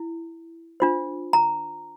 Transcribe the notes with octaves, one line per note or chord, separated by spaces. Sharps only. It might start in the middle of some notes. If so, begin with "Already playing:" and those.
Already playing: E4
D4 F4 C5
A#5